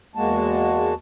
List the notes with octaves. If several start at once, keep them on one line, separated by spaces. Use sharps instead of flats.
E2 G#3 A#3 F#4 A5